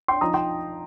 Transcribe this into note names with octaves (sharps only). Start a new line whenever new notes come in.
G5 C6
F3 D#4 A#5 D#6
G5 C6